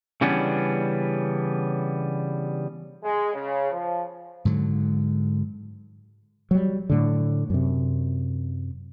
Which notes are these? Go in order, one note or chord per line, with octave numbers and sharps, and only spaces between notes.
C#3 E3 G3 B3 C#4 D4
G#3
C#3
F3
G#2 D3 F#3
F#3 G3
A2 D3
F#2 C3